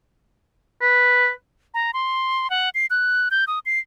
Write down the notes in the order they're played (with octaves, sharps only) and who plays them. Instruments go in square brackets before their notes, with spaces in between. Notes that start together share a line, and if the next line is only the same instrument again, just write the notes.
[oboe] B4
[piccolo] A#5
C6
F#5
C7
F#6
G6
D#6
C7